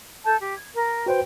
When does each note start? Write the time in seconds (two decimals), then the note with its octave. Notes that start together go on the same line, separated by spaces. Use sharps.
0.25 A4 A5 G6
0.39 G4
0.56 G#6
0.75 A#4
1.06 F#4 B4 C5 G5